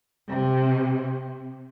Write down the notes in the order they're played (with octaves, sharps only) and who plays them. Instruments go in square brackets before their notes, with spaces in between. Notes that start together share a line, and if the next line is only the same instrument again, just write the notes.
[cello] C3